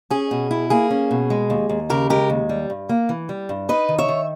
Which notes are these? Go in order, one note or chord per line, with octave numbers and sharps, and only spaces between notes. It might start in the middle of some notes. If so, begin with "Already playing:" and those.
C#4 G#4
B2
E4
A#3 G#4
C#4
B2
G#3
D#2
D#2
C#3 G4 A#4
G#3 G4 A#4
D#2
G3
G2
A#3
E3
G3
G2
D#4 B4 D#5
D#3
C#5 E5
D#3